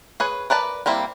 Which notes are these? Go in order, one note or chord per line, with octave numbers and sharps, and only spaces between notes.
G#4 B4 C#5
A#4 B4 D5 A5
G3 A#3 C4 E4